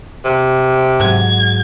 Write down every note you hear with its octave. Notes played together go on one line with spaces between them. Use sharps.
C3
G#2 F#3 G#6